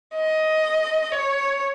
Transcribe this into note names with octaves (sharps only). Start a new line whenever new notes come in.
D#5
C#5